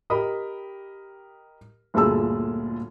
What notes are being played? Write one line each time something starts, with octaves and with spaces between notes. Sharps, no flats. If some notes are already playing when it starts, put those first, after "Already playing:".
G4 A#4 D#5 B5 D#6
G1 D2 A#2 G#4 A5 E6